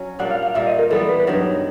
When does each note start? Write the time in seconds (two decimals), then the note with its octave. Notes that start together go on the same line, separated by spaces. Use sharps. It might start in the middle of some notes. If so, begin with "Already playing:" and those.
Already playing: F#3 C#4
0.19 A#2 G3 A#3 D4 F#5
0.31 F5
0.43 F5
0.54 A#2 G3 A#3 E5
0.67 D#5
0.79 A#4
0.90 E3 G3 B3 A4
1.09 B4
1.27 G2 D#3 F#3